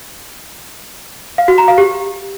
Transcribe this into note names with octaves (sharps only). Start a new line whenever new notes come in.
F5
F#4
A#5
F5
G4